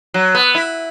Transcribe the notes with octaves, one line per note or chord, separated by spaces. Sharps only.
F#3
B3
E4